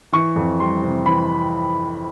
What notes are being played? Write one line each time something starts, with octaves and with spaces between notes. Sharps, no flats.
E3 C#6
F2
G3 C6
C3
E3 B5